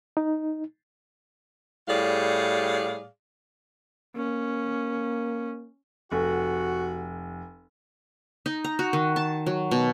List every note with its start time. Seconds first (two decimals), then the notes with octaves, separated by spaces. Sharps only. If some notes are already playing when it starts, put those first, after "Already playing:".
0.17 D#4
1.89 A2 G3 G#4 D5 F5
4.16 A#3 C#4
6.12 F1 F#4
8.46 D#4
8.64 A#5
8.79 F#4
8.93 D#3
9.16 A5
9.46 F#3
9.71 B2